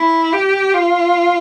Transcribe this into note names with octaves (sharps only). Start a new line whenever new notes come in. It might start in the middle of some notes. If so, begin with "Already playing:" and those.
Already playing: E4
G4
F4